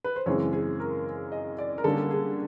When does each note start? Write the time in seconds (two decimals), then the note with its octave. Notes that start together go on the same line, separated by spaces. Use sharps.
0.04 B4
0.16 C5
0.26 F#2 C#3 E3 G#3 C4 C#5
0.53 G#4
0.80 A#4
1.32 D#5
1.59 D5
1.78 A#4
1.84 D3 G3 A#3 C#4 A4
2.11 G#4